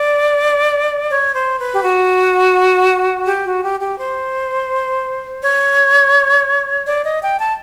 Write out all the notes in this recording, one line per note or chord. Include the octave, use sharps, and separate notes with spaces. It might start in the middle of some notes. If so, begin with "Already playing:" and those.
Already playing: D5
C#5
C5
B4
G4
F#4
G4
F#4
G4
G4
C5
C#5
D5
D#5
G5
A5